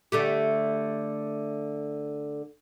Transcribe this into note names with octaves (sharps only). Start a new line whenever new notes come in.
D3 A3 G4